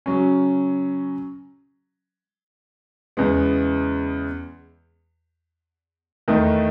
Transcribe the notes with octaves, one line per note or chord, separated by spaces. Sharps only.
C#3 F#3 C#4
E2 C#3 G#3 B3
E2 D#3 A3 D#4